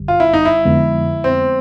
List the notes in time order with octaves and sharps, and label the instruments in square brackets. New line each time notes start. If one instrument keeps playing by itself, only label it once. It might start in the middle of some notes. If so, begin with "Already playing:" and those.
Already playing: [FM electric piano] G1 F#2 D3 G3
[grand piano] F4
E4
D#4
E4
[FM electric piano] F2 D3 F3 G#3 B3
[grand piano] C4